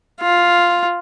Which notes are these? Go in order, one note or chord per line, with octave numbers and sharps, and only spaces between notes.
F4